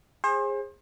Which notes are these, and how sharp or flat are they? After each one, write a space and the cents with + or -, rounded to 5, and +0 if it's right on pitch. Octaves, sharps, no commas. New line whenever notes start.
G#4 -20 C5 +35